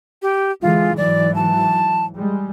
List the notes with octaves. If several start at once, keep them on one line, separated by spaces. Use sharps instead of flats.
G4
D3 E3 G#3 F4
G#2 E3 F#3 D5
A5
G3 G#3